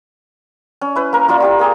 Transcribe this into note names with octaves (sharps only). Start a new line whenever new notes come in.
C#4
E4 B4
A#3 A#4
A#3 E4 F4 D5
F4 G4 F5
G4 G#4 A#4